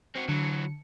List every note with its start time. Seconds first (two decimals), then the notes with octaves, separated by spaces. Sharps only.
0.15 C4 F#4
0.29 D3 E3 F#3 C#7